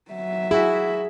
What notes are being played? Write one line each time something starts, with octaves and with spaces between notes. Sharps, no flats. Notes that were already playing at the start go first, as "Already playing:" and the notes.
F#3 E5
E4 F#4 G#4